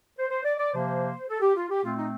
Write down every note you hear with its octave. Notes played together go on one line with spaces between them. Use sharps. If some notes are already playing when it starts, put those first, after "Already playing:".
C5
C5
D5
D5
C3 F3 A#3 C5
A4
G4
F4
G4
A#2 A3 C4 F4
D#4